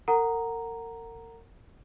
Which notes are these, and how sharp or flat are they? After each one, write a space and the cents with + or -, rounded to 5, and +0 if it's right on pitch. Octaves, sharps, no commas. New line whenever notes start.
A#4 -35 F#5 +0 A#5 +0